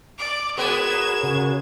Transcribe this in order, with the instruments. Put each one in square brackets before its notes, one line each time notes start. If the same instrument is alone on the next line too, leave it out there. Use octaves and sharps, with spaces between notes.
[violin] D5 D6
[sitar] G#3 B3 [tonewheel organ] F#4 A#4 C#5 [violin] G#6 E7
[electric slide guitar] C#3